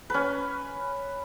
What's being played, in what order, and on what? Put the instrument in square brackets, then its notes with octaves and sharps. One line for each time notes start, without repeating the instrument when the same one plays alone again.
[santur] C#4 B4